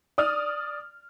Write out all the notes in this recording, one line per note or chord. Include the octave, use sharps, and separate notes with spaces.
D5 D#6 F6